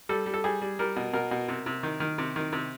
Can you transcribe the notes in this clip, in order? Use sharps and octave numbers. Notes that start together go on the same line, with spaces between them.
G3 A4
G3
A4
G3 G#4
G3
G3 A#4
B2
B2 A#4
B2
C3
C3
D#3
D#3
C3
D#3
C3